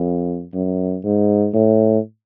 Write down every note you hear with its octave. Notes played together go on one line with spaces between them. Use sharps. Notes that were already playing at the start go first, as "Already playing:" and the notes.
Already playing: F2
F#2
G#2
A2